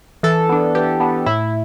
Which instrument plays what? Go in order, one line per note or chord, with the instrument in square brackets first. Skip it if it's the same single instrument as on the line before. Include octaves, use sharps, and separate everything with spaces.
[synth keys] E3 A4
B3 D4
E3 G4
B3 D4
A2 E4